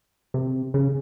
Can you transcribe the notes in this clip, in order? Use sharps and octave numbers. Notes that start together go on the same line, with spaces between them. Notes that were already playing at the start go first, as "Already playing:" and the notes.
C3
C#3